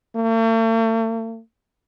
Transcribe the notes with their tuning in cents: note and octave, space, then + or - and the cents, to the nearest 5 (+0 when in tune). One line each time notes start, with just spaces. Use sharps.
A3 +45